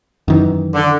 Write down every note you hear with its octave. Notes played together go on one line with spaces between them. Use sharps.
F#2 D#3 E3
D3